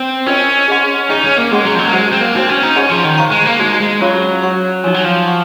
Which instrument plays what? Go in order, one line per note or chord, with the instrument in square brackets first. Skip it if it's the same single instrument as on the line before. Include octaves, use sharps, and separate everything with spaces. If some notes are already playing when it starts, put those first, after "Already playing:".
Already playing: [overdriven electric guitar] C4
[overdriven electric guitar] C#4 [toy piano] F4 A#4 D#5 G#5
[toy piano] G#4 D#5 F#5 C6
[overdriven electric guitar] D#4 [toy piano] G#4 D#5 G#5
[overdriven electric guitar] C#4
A#3
[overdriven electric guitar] G#3 [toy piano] C#4 G#4 D#5 F#5 C6
[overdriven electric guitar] F#3
F3
F#3
A#3
[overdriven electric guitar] G#3 [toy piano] F#4 C5 F#5
[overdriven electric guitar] C4
A#3
[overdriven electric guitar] C4 [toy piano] D#4 F#4 C5
[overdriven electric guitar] C#4
D#4
[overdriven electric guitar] C#4 [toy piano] G#4 D#5 F#5 C6
[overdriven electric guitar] F3
D#3
[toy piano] C5 F5 A#5 C#6
[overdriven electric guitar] G#3
A#3
[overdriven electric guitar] G#3 [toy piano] D#4 F#4 C5
[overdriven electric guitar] G#3
[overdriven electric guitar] F#3 [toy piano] C#4 F4 G#4 C#5 F5
[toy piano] F#4 C#5 F#5 C#6
[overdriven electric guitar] F3 [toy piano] D#4 F#4 C#5 G#5
[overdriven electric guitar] F#3
F3
[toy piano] F#5 C#6